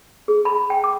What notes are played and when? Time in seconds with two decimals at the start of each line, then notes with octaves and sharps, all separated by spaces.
0.28 G#4
0.45 B5
0.70 G5
0.84 D6